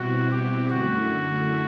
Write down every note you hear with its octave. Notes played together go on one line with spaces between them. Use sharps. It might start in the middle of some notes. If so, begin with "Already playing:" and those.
Already playing: B2 G3 C4 E4 F#4
G4
F#2 D3 A3 E4 F#4